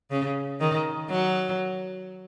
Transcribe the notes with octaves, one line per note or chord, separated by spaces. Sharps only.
C#3
D#3
F#3